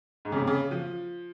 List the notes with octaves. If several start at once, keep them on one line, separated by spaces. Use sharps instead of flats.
G#2
C#3
C3
C#3
F3